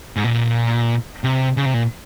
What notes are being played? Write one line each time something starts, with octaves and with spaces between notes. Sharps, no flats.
G#2
A#2
C3
C#3
C3
A#2